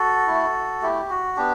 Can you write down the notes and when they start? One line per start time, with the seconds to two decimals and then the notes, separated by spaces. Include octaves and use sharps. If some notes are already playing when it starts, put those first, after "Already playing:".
Already playing: F#4 A4
0.27 A3 E4
0.82 A3 E4 G4
1.10 F#4
1.36 B3 D4 G4